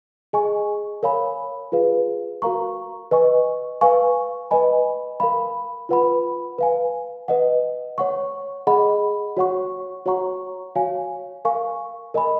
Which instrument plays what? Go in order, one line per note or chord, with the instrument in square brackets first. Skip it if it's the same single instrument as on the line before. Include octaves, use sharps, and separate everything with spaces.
[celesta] G#4 D#5 G#5 C#6
A#4 C#5 F5 G#5 B5
F4 G#4 B4 F5
F#4 A#4 F5 A#5 C#6
B4 D#5 G#5 C#6
B4 F5 G#5 C#6
B4 D#5 G#5 B5
A#4 F5 B5
F4 B4 F#5 B5
B4 F5 G#5
B4 D#5 F#5
C#5 F#5 C#6
G#4 D#5 F#5 B5
F#4 C#5 F#5 C#6
F#4 C#5 F#5 A#5 C#6
F#4 C#5 F5 G#5
A#4 F5 G#5 C#6
A#4 D#5 G#5 B5